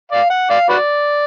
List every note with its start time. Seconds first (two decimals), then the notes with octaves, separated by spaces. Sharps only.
0.12 D5 F5
0.30 F#5
0.50 D5 F5
0.69 F#4 B4 D5